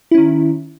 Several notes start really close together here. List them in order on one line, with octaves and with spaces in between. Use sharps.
E4 C#4 D#3